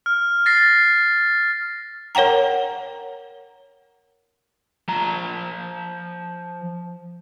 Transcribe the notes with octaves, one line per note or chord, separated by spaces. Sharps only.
F6
A6 A#6 C7
A#4 C#5 F#5 G5 A#5
F3 A#5